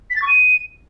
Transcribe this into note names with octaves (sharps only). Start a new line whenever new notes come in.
B6
A6
C#6
D#7